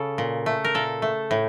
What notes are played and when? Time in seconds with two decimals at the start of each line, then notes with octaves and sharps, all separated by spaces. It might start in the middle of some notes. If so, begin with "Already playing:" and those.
Already playing: C#3 A4
0.18 A#2
0.46 A3
0.65 A#4
0.74 A#2 A4
1.02 A3
1.31 A2